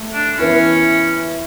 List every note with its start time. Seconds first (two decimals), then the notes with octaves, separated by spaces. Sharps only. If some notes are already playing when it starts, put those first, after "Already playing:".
Already playing: A3
0.13 D4
0.38 E3 B3 C#4 E4